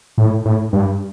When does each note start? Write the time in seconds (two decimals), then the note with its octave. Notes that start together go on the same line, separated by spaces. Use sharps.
0.18 A2
0.45 A2
0.73 G2